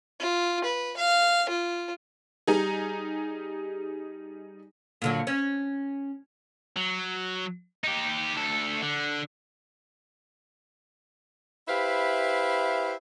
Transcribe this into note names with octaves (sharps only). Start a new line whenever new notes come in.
F4
B4
F5
F4
G3 D#4 G#4
A#2 D3 F#3
C#4
F#3
D#4 G4
D2 A4
D3
E4 G4 B4 C5 E5 F5